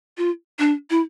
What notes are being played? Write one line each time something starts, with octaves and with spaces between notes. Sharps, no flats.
F4
D4
E4